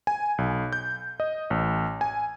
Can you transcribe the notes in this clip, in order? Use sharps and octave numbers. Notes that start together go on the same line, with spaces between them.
G#5
B1
G6
D#5
A1
G#5